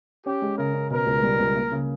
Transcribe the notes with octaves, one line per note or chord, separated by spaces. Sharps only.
C#4 G4
G#3
C#3 A#4
C#4
B2 A#4
C#2
G3
C#2
A#3
C#3